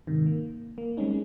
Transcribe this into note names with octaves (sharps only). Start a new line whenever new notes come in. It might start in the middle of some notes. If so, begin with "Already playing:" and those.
G#2 C3 D#3
A#3
A#3
G3 G#3 C4 C#4 D#4